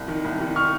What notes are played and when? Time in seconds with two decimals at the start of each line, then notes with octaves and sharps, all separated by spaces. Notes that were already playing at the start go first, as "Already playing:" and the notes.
Already playing: C2
0.08 D#3
0.25 C2
0.41 D#3
0.56 C#6 F6